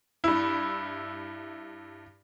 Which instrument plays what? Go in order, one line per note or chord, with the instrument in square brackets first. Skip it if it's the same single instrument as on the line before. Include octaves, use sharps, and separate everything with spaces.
[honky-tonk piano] G2 E4